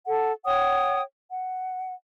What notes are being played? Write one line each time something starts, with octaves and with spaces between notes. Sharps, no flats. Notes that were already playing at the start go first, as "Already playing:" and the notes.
A4 F#5
C#5 F#5 G5 D#6
F#5